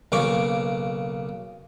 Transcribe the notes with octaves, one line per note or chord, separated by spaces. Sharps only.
B1 C#3 A#3 C#6 D6